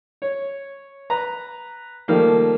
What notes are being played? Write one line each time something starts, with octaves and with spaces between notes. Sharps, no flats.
C#5
B4 A#5
D#3 F3 G3 A3 A#3